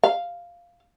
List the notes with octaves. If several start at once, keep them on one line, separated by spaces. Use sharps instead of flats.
F5